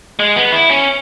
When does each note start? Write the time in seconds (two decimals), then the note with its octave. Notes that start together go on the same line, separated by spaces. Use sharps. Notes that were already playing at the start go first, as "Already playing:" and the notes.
0.19 G#3
0.36 B3
0.52 E4
0.70 C#4